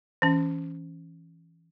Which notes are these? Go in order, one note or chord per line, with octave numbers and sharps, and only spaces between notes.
E3 C#4